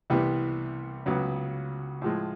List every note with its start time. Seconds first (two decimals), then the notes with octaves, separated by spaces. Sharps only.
0.10 C2 C3 E3 G3 B3
1.06 C#2 C#3 F#3 B3
2.02 A2 F3 G#3